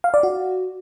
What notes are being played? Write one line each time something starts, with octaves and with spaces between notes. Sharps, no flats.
F5
D5
F#4